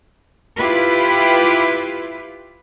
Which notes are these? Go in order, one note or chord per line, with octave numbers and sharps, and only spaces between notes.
E4 F4 G4 B4